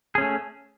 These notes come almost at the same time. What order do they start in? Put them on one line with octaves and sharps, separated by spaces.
G#4 C#4 A3